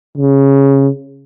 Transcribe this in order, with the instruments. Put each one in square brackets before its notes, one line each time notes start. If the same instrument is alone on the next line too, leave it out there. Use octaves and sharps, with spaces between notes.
[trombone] C#3